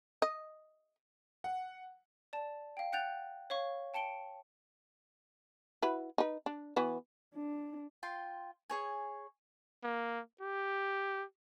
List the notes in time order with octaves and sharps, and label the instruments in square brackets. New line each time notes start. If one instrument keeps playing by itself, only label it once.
[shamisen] D#5
[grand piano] F#5
[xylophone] D5 A5
F5 G5
F#5 G5 F#6 G6 A6 F7
C#5 F5 C#6
G5 A5 C#7 D7 G7
[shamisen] E4 F#4 B4
D#4 B4
D4
E3 B3 F#4
[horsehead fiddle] D4
[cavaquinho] F4 G5 C6
G#4 C#5 G#5
[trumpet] A#3
G4